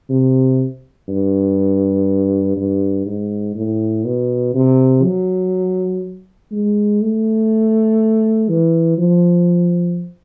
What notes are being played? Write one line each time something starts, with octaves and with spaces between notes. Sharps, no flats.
C3
G2
G2
G#2
A2
B2
C3
F#3
G#3
A3
E3
F3